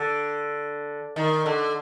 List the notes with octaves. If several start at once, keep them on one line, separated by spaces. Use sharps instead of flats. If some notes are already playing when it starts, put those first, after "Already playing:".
Already playing: D3
D#3
D3